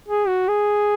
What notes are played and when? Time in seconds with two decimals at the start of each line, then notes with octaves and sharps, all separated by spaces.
0.08 G#4
0.28 F#4
0.48 G#4